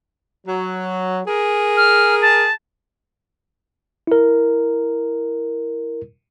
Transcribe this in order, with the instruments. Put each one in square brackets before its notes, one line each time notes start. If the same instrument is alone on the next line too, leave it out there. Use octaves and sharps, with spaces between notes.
[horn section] F#3
G#4 A#4
[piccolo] F6
A5
[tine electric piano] E4 A#4